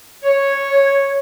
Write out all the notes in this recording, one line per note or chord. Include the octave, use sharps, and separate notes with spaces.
C#5